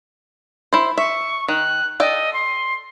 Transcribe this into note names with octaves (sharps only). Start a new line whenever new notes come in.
E4 C5
E5 C#6
D#3 F#6
A4 D5 D#5 G5
C6